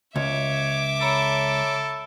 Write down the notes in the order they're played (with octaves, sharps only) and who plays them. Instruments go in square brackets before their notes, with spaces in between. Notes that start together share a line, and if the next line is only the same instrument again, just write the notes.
[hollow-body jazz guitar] C#2 [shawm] C#5 [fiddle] E5 D6
[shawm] A4 [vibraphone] C#5 A#5 B5